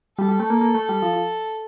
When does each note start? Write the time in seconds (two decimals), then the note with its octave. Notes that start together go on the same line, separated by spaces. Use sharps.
0.18 G3 A4
0.29 G3
0.40 A3
0.50 A#3
0.61 A#3
0.75 A3
0.89 G3
1.02 F3
1.13 F3